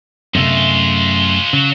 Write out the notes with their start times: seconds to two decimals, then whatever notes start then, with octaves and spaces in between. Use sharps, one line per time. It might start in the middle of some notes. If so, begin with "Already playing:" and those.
0.35 F#2 C3 G#3 A3 B3 C4 F4 E5
1.53 C#3 F#3